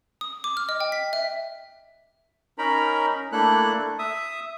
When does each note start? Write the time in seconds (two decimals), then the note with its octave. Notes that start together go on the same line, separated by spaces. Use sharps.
0.21 D#6
0.44 D6
0.57 F6
0.69 D#5
0.80 G5
0.92 B6
1.13 E5
2.58 C#4 D#4 A#4 A#5 B5
3.32 A3 A#3 D4 E4 A4 F#6
3.99 E5 D#6